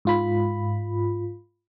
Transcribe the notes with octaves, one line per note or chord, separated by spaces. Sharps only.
G#2 F4 B5